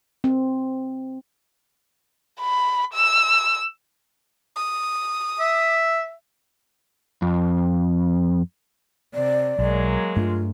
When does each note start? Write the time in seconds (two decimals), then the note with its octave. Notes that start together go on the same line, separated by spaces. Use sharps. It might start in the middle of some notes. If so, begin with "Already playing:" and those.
0.24 C4
2.40 B5
2.94 E6
4.56 D#6
5.40 E5
7.22 F2
9.14 C3 D5
9.59 B1 F#3 G#3 A#3
10.16 G2 A3 D4 F4